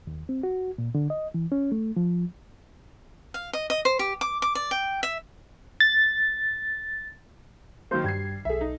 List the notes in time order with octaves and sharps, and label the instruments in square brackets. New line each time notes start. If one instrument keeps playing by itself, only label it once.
[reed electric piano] D#2
C4
F#4
A#2
D3
D#5
E3
C#4
A3
F3
[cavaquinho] F5
D#5
D#5
C5
G4
D6
D6
D5
G5
E5
[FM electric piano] A6
[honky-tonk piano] D#3 F#3 A#3 [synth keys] C5 C6 G6
[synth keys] G2 G#6 [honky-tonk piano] G3 C7
[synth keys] B1 A4 [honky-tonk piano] G#4 E5
[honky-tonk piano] D#4